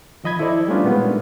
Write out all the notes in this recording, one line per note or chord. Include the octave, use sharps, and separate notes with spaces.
D#3 F3 D#5 B5 G#6
E4 A4 C5 D5
G3 A3 B3 C#4 D4 F4
A#2 G#3 A#3 B3 D#4